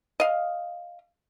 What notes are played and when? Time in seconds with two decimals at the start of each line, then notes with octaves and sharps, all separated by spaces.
0.20 D#5 F5